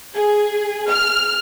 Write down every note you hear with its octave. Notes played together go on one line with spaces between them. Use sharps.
G#4
F6